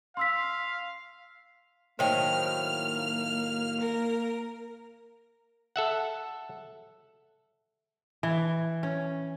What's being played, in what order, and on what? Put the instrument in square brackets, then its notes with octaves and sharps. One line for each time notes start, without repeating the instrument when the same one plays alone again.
[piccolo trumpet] F5 [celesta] C6 E6 B6
[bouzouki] A2 D#3 F#3 [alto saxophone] A#3 [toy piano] C5 G5 [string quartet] F6
[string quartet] A#4
[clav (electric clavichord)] A4 E5 F#5
[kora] E3
C#4